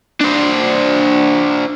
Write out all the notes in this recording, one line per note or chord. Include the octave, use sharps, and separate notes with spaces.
D4 C5